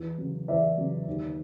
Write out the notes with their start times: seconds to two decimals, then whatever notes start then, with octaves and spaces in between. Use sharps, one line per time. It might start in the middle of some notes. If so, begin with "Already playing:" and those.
Already playing: E2
0.18 C#3 F#3
0.48 E2 D5 E5
0.78 C#3 F#3
1.07 D#2